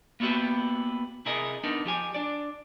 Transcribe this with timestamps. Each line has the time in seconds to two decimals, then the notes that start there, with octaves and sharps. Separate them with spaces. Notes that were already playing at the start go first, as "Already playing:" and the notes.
0.20 A#3 B3 E4 F#4 G4 B4
1.26 C3 E4 G#4 A#4 D#5
1.64 B3 D4 D#4 A#4
1.85 F3 G4 G#5
2.15 D4 D5